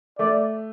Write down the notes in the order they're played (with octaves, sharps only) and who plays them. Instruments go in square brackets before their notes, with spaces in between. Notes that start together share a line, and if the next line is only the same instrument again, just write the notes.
[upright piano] A3 [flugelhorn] D5